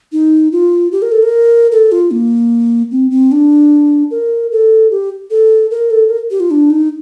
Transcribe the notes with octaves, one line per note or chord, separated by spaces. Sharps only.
D#4
F4
G4
A#4
A4
A#4
A4
F4
A#3
C4
C4
D4
A#4
A4
G4
A4
A#4
A4
A#4
G4
F4
D4
D#4